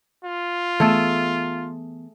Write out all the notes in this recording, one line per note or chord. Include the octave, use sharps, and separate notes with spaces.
F4
E3 A3 B3 G#4 A4